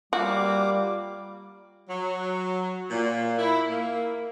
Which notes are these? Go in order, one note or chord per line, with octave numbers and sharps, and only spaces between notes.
G3 A#3 F4 F#4 F5 D6
F#3
A#2
E4
A#3